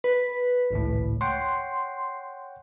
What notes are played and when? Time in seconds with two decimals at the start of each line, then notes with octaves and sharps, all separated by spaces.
0.04 B4
0.71 G#1 C#2 A2
1.21 C#5 F#5 G5 C6